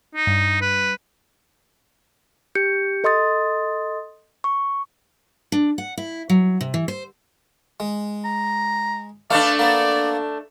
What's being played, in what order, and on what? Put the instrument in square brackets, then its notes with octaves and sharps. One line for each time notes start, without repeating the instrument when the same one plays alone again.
[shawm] D#4
[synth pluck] G2
[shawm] B4
[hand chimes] G4 G6 C#7
A4 D#5 C6 D#6 A6
C#6
[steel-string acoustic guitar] D4
F#5
E4
F#3
C3
E3
C5
[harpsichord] G#3
[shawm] A#5
[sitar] A3 D4 [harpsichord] B4 F5 [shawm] D5
[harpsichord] A#3 B3